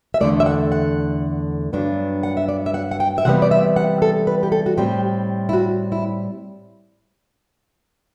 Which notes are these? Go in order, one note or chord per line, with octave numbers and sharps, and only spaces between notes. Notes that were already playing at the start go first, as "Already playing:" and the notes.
E5
E2 D3 A3 D5
E5
F#5
F#5
G2 F#3 B3 D4
F#5
E5
D5
E5
F#5
F#5
G5
E5
C3 E3 G3 B3 F#5
D5
E5
F#5
A4
B4
G4
A4
F#4
A2 G3 C4 G4
E4
F#4
E4